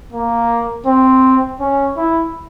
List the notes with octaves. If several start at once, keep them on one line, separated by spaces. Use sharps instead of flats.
A#3
C4
C#4
E4